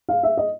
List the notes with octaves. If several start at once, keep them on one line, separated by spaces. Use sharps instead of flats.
F5
E5
D#5